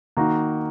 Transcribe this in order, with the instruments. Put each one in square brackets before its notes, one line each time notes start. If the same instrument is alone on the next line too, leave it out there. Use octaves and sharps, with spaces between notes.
[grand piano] D#3 A#3 D#4 F#4